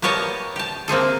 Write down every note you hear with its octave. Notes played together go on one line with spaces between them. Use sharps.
A#3 B3 G4 C#5 D#5 A5
G4 A5
A#3 C4 G#4 A4